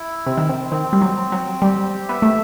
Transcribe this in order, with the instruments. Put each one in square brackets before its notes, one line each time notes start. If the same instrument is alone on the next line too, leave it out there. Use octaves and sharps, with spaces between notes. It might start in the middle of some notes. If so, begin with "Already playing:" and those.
Already playing: [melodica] E4
[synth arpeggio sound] C3 [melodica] C4
[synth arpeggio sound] D#3
C3
[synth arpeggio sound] D#3 [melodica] C4
[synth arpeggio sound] G3
F#3
[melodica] C4
[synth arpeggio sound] F#3
[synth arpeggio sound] G3 [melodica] G4
[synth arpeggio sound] B3 [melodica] E5
[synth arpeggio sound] A3